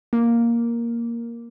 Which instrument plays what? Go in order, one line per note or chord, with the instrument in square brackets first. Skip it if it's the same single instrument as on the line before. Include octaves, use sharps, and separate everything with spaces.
[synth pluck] A#3